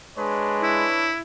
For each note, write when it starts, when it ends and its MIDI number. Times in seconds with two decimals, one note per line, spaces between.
0.18 0.86 56
0.18 1.14 62
0.18 1.14 71
0.18 1.14 73
0.62 1.21 64